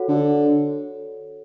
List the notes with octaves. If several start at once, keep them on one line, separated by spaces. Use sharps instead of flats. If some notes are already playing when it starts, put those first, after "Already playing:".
Already playing: F#4 A4 C#5 F#5
D3